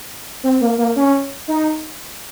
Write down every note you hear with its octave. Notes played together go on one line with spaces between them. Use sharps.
C4
A#3
A#3
C#4
D#4